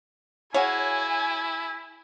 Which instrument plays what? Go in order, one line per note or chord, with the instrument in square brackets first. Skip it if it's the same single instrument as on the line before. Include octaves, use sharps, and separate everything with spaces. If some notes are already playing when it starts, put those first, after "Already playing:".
[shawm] E4 [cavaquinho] F#4 G#4 F5 [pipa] C#5 [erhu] G#5